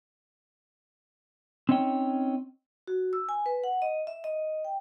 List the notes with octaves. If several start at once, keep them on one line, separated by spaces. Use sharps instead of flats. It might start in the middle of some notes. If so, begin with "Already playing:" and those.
C4 C#4 D#4 C#5 G5
F#4
E6
G#5
B4
F#5
D#5
E5
D#5
G5